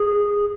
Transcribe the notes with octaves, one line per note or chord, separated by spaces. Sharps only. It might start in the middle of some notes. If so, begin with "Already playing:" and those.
Already playing: G#4